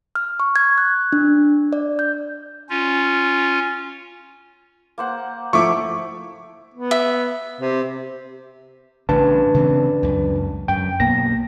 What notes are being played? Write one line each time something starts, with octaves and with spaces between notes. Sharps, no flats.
F6
C#6
G#6
F#6
D4
D5
G6
C#4 F4
A#3 C5 F#5
F3 A3 E4 C#6 D6
B3
E5
C3
A1 C#3 D4 B4 A5
C#3 E3 C4
C#2 F#2
F#2 G5
B1 A#3 B3 A#6